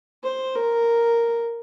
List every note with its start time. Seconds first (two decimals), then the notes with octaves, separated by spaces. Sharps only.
0.24 C5
0.56 A#4